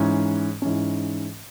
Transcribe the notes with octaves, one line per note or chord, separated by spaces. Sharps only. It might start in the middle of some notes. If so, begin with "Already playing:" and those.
Already playing: G#2 E3 C#4
G#2 E3 C#4